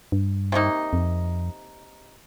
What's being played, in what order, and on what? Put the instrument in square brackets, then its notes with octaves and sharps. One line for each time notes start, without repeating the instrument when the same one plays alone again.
[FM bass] G2
[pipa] C3 D#3 A#3 D#4
[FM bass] F2